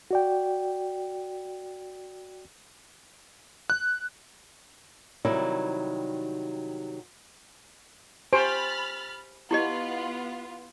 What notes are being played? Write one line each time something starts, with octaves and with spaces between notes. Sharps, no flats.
F#4 D5 G5
F#6
C3 D#3 F#3 G3 D#4 E4
G4 C5 G#5 B5 F6 A6
B3 E4 F4 G4 D#5